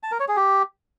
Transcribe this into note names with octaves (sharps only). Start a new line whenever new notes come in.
A5
A#4
C#5
G#4
G4